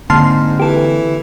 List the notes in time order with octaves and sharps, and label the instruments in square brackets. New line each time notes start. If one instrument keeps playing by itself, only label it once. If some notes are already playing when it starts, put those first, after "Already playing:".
[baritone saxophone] G#2 [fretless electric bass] D3 A#3 C4 [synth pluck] A5 C6 F6
[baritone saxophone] E3 [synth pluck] G4 A4